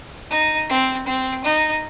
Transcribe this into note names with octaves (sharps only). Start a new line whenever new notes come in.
D#4
C4
C4
D#4